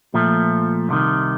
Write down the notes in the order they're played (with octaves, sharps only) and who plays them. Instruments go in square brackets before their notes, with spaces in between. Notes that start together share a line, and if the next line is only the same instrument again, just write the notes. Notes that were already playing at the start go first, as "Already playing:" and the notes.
[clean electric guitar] A#2 F3 A3
C2 C3 D#3